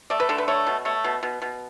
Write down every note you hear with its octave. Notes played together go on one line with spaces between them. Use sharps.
A3 D5
B4
D3 A4
B4
A3 C#5
B2
A3 C#5
B2
B2
B2